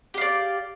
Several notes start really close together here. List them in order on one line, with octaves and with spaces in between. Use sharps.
G4 F5 D5